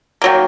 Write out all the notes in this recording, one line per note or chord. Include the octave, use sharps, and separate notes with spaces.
D#3 F#3 A#3